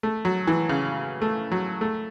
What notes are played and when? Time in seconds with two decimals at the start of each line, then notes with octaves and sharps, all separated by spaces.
0.03 A3
0.25 F#3
0.47 E3
0.69 C#3
1.22 A3
1.52 F#3
1.81 A3